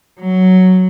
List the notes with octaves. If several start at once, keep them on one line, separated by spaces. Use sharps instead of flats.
F#3